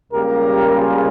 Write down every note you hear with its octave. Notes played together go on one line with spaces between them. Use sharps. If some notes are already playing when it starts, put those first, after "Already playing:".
C#2 C#3 G3 A#3 G4 A#4
F4 G#4